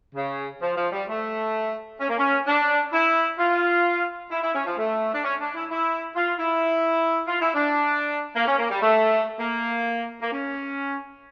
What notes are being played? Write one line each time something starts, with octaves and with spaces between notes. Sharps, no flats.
C#3
F3
F3
G3
A3
C#4
A#3
C#4
D4
E4
F4
E4
E4
C#4
F3
A3
D4
C#4
D4
E4
E4
F4
E4
F4
E4
D4
A#3
C#4
A#3
G3
A3
A#3
A#3
C#4